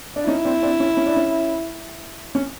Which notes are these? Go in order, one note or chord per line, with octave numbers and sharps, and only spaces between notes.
D4
C#4 D#4 E4
C4 D4
C4 D4
C#4
C#4
D4
C#4
C#4